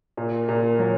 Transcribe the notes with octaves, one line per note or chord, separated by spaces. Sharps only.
A#2
A#2
F#3